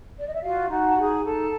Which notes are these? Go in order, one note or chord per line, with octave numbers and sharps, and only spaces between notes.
D5
D#5
E5
F4 F#4 F5
D#4 F#4 F#5
A5
D#4 G#4 G#5
D#4 A4 A5